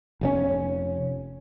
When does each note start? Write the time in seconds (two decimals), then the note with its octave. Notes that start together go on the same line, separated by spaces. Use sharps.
0.21 F1 C3 C#4